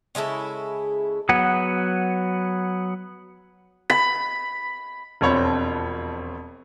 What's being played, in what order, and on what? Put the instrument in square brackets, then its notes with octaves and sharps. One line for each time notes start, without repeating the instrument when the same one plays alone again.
[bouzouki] C#3 G#3 E4 A4
[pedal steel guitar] F#3 B3 F#5
[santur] B5
[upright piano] E1 F2 C4 C#5 B5